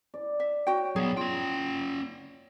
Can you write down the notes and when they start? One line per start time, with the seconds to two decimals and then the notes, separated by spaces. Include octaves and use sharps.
0.14 D5
0.40 E5
0.67 F#4 C#5 G5
0.96 F#3 B3 G#4
1.17 C#4 F4 G5